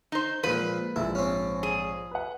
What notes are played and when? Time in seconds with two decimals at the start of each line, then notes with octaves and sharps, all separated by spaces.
0.12 D#4 C5
0.43 A#2 F3 G#3 B4 B6
0.96 A#1 G#2 E4
1.15 C4 C#4
1.63 G#4
2.11 B4 F#5